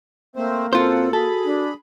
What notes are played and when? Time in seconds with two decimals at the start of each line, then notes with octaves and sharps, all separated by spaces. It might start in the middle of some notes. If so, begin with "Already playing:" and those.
0.36 A3 A#3 C4 C5
0.73 F#2 C4 F4 A4 C5 F#5
1.13 F#4 G#4 A4 B5
1.45 D4